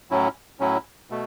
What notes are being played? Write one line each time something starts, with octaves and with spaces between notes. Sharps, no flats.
A2 F#3 C#4 E4
A2 F#3 C#4 E4
B2 A3